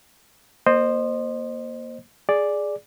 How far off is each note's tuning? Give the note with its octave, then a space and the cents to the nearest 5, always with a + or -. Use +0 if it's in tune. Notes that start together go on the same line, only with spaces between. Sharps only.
A#3 +10 C5 +10 D#5 -25
G#4 +0 D5 +0